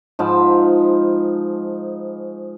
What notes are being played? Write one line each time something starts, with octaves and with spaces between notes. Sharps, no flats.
G#2 F3 A5 B5